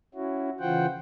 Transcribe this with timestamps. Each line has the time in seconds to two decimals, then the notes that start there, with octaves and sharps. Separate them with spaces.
0.15 C#4 E4 F#4
0.60 C#3 E3 F4 C5 F#5 G5